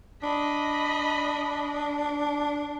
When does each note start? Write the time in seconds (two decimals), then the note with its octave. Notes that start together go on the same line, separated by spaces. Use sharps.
0.23 D4 D#5 B5